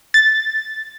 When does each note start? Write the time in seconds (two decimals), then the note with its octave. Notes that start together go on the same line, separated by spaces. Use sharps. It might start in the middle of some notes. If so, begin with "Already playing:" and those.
0.14 A6